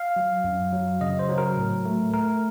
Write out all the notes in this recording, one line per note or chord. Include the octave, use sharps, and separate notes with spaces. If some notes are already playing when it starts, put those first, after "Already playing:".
Already playing: F5
F#3
F#2
F#3
C#3 D#5
C5
F#3
A#4
A2
A3
A3 A#4